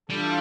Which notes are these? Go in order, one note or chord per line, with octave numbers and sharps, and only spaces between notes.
E3 G3 D4 F4 A4